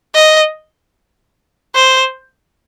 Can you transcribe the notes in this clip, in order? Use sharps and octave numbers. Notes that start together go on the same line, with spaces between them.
D#5
C5